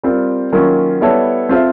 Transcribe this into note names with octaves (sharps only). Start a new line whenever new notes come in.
G3 C4 F4 A#4
D#3 F#3 A#3 C#4 F4
G3 B3 E4 A4 C#5
C4 F4 A4 C5 E5